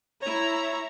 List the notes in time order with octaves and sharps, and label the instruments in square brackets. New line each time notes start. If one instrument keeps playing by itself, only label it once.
[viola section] E4 A#5 [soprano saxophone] C#5